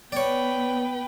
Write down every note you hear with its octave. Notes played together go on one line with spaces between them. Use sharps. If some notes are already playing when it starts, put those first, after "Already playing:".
B3 B4 C#5 D5 G5